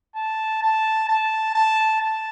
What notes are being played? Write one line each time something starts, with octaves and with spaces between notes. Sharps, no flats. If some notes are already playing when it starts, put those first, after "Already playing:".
A5
A5
A5
A5
A5